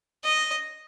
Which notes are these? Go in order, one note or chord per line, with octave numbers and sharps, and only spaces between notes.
D#5